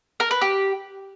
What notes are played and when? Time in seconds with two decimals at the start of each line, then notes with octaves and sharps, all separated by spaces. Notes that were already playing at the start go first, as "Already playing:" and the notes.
0.20 A#4
0.31 B4
0.41 G4